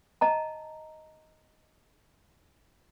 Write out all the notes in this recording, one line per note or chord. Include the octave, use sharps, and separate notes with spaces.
D#5 A5 A#5